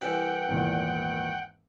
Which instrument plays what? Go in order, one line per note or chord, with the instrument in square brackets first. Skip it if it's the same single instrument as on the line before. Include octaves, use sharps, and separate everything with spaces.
[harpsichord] C2 E3 G4 [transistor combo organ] F#5 G5
[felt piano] G#1 E2 A#2